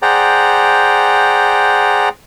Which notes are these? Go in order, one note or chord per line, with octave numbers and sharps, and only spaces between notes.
G#4 C5 D5 F#5 G5 A#5